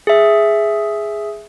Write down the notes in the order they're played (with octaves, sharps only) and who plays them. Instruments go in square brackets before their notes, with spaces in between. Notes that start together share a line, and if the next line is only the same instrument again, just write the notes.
[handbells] G#4 E5